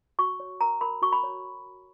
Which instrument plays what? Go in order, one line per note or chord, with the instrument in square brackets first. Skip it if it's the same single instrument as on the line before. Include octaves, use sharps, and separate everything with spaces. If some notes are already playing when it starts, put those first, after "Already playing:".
[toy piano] F#4 C#6
C#5
A#4 A#5
A#4 B5
F#4 C#6
B5
C#5